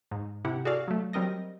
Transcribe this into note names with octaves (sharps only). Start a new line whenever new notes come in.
G#2
C3 E4 G4 F#5
F#4 G#4 A4 D5 F5
F#3 A3
F#3 G3 C4 A#4 D#5 A#6